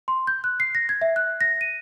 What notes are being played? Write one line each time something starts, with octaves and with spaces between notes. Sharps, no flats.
C6
G6
F#6
C7
A#6
G#6
E5
F#6
A#6
D#7